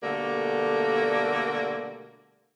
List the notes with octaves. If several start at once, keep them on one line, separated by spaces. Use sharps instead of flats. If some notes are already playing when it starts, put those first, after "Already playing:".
B2 D3 G3 A3 A#3